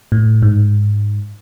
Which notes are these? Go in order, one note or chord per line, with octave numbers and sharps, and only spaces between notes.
A2
G#2